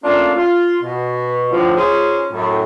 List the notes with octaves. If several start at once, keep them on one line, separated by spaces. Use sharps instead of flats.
A3 A#3 C#4 D4 F4
F4
B2
A2 D3 F3
C#4 D#4 F4 G#4 C5
F#2 A2